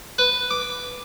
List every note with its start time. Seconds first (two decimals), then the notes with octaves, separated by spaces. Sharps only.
0.18 B4
0.51 D6